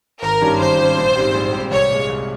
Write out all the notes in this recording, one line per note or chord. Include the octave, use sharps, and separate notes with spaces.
G#1 A#4
G2 D#3 G3 C#4
G#1 C5
G2 D#3 G3 C#4
A#1
G#2 G3 C4 G4
A#1
G#2 G3 C4 G4
C2 C#5
A#2 G#3
C2